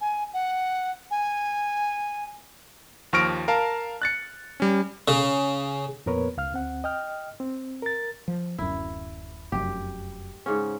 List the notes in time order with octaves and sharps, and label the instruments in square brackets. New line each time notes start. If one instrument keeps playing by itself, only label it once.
[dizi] G#5
F#5
G#5
[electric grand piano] D#2 F3 C#6 F6 A#6 D7
A#4 F5 A5
F#6 A6 C#7
G3 C#4
[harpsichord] C#3
[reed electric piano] F2 A#2 B3 A#4 B4 C#5
C#2 F5 F6
D2 C4 F#5
D#5 G5 F6
C4
A#4 A6
[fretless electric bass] F3
[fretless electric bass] D1 F#2 [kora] E4
[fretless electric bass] F1 F#2 [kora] G4
[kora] G#2 C#3 C#4